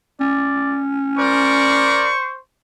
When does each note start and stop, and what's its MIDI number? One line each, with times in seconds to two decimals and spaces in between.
0.20 2.09 61
0.20 0.79 74
1.18 2.14 70
1.18 2.38 72
1.18 2.14 74
1.18 2.40 85